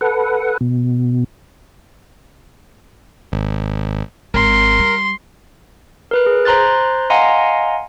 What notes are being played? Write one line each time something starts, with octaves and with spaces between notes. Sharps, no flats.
A4 B4 F#5
B2
G#1
G#1 A#4 C6
G3
A#4 B4 F#6
G#4
C5 A#5 C6 F#6 A6
D#5 F5 F#5 G#5 A#5 C6